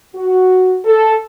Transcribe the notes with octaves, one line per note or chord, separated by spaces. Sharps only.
F#4
A4